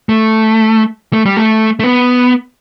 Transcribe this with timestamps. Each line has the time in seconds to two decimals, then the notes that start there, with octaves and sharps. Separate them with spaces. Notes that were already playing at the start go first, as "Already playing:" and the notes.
0.09 A3
1.13 A3
1.26 G3
1.37 A3
1.80 A3
1.84 B3